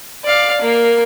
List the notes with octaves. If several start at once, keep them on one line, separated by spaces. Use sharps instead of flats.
D5 F5
A#3